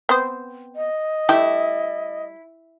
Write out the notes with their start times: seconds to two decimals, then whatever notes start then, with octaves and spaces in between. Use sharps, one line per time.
0.09 B3 C4 C5
0.76 D#5
1.29 G3 A3 E4 G4